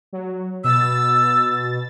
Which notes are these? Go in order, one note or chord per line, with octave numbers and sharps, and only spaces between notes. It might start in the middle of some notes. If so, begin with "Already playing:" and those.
F#3
B2 E6 A6